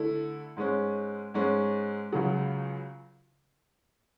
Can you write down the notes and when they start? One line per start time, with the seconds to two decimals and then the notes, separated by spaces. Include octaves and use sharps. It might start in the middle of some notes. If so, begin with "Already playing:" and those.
Already playing: D3 A3 E4 A4
0.56 G#2 G#3 C#4
1.34 G#2 G#3 C#4
2.12 C#2 C#3 F#3